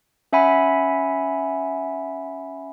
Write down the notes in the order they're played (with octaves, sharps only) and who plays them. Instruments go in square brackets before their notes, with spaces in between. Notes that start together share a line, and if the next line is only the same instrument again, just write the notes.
[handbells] C#4 E5 F#5 G#5 B5